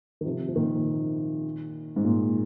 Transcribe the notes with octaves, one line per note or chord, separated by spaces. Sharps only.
D#3
C3 F3
F3
A#2 D#3
G#2
A#2